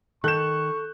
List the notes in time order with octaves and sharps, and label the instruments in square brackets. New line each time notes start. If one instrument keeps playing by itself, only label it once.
[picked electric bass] D#3 [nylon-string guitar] A4 [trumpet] C#6 [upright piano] F#6 G6 E7